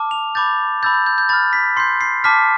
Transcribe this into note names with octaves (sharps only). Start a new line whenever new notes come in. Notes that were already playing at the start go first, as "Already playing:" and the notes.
Already playing: A5 D6 F6
F7
B5 D6 G6 A6
B5 E6 G6 A6
G6
G6
G6
B5 F6 A6
B6
C6 G6 C7
C7
A5 D6 F6 B6